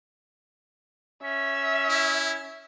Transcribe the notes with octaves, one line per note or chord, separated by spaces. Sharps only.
C#4 E5
E4